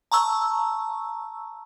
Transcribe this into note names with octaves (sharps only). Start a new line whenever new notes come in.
A5 A#5 C#6 E6